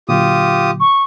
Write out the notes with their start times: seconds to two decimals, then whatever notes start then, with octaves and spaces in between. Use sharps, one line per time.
0.09 A#2 D3 F#3 F4 G4 D#6
0.80 C#6